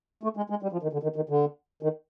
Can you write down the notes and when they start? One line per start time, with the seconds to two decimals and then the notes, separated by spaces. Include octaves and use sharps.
0.23 A3
0.37 G#3
0.50 G#3
0.63 G3
0.72 F3
0.83 D#3
0.93 D3
1.03 D#3
1.16 D#3
1.29 D3
1.82 D#3